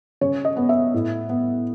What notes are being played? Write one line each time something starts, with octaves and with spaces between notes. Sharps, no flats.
C#3 C#5
D#5
B3
E5
A2
B3